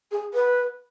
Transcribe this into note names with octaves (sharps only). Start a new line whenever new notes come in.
G#4
B4